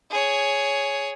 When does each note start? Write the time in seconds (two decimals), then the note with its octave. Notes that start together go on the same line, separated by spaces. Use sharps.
0.10 G#4 C#5